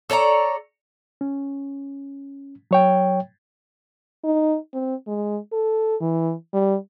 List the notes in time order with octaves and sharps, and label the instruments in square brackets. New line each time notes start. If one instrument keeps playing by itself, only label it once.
[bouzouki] A4 C#5 D5 A#5
[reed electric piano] C#4
F#3 C#5 G5
[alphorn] D#4
C4
G#3
A4
E3
G3